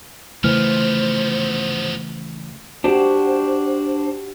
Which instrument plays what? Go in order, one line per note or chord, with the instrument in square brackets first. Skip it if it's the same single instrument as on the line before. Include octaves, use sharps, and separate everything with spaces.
[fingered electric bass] C#3 A3 [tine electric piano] E3 F6 [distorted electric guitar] F3 B3 [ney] C5
[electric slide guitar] D4 C5 [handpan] F#4 G4